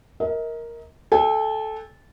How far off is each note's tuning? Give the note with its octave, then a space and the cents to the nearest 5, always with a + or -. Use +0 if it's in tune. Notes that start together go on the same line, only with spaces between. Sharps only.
A#4 +0 D#5 +40
A4 -15 G5 +40